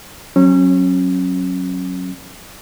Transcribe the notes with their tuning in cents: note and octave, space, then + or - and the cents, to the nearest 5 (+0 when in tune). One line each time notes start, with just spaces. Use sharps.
F#3 +0 C#4 -30